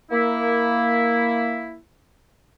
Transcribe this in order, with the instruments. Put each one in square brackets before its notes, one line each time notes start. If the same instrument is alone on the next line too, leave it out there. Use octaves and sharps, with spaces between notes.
[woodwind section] A#3 E4